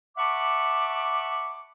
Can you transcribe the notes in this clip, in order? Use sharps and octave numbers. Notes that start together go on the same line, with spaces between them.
E5 F#5 A5 B5 C#6 D6